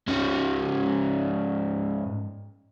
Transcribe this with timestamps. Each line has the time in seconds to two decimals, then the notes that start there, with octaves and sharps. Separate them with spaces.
0.08 G#2 C#4